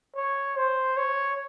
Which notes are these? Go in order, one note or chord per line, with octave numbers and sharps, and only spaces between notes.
C#5
C5
C#5